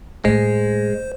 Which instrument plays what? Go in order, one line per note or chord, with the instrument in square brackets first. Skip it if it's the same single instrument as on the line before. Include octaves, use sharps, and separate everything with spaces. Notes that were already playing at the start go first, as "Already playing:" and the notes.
[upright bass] A2 A3 [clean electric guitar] G#3 [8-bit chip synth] C5